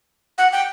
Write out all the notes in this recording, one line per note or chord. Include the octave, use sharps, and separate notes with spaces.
F#5
G5